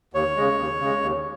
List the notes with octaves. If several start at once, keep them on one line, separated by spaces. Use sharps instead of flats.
D#2 C#5
C#3 G#3
D#2
C#3 G#3
D#2